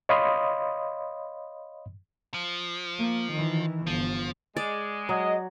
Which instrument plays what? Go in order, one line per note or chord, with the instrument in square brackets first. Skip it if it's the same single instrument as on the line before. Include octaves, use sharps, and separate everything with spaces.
[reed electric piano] C#5 D#5 F5 B5 C6 D#6
[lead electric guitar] F3
[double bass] A#3
D#3 E3
[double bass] G1 [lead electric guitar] F3
[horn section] G#3 [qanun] D5
[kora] F#3 [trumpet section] D#5